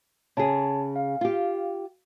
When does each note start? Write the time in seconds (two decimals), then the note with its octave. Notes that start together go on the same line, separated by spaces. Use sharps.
0.37 C#3 G#4 C#5 A5
0.96 F5
1.21 F4 G4